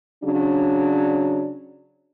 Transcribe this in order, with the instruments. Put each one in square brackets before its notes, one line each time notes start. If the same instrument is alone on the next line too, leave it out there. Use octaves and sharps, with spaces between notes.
[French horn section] C#3 F#3 D4